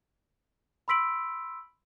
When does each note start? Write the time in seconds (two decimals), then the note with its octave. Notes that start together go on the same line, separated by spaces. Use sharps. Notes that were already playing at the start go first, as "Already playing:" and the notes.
0.88 B5 C6 E6 B6 D7 F#7